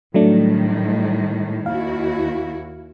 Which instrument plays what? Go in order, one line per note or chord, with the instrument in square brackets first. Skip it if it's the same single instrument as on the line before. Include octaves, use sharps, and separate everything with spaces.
[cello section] A2 D#3 G3 [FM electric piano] F#3 A3 D4
[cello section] D#2 E4 F#4 [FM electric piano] F5